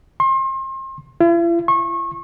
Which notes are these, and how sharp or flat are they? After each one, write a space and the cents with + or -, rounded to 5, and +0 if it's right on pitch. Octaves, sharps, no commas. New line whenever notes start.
C6 +35
E4 +45
C#6 -30